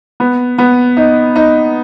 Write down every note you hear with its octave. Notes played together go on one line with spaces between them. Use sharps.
B3
B3
D#4
D#4